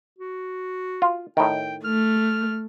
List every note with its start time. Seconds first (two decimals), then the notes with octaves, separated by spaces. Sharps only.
0.19 F#4
1.02 F4
1.37 A2 D#3 G5
1.84 A3 F6